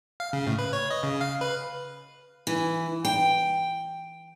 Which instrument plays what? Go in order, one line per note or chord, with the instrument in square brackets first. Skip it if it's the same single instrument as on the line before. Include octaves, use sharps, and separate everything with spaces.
[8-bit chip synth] F5
C#3
A2
B4
C#5
D#5
C#3
F5
B4
[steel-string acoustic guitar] E3
G5